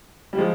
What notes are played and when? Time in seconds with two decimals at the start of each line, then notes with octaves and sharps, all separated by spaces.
0.33 G3
0.38 F3 G#3